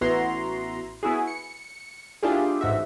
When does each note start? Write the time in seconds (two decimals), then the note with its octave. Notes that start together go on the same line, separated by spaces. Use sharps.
0.01 A1 B3 E4 F#4 A#5 C6
1.03 B3 E4 F#4 G#4
1.27 C#7
2.23 A#3 D4 E4 F4 G4 G#4
2.61 A1 G#2 F#4 E5